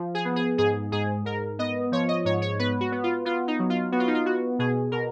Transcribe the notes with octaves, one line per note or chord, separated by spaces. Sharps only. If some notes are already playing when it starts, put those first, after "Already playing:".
Already playing: F3
G#4
B3
G#4
G#2 G#4
G#2 G#4
G#2 A#4
B3 D#5
F3 C#5
D#5
G#2 C#5
C#5
B3 B4
F#4
B3
F4
B3 F4
D#4
F#3
F4
B3 F#4
F4
D#4
F4
B3 F#4
B2 G#4
B2 A#4